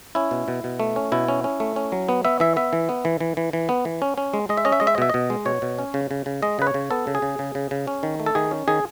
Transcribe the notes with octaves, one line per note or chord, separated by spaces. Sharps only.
C#4 E4
B2
B2
B2
A3
C#4
B2 E4
C#4
C#4
A3
C#4
F#3
B3
B3 E5
E3 E5
B3 E5
E3
B3
E3
E3
E3
E3
B3
E3
C#4
C#4
G#3
G#3 D#5
E5
C#4 D#5
E5
G#3 D#5
E5
D#5
B2 E5
B2 D#5
G#3
B2 C#5
B2
C#4
C#3
C#3
C#3
G#3 D#5
C#3 B4
C#5
C#3
B3 A4
C#3
G#4
C#3
C#3
C#3
C#3
C#4
D#3
A3
A4
D#3 G#4
C#4
D#3 G#4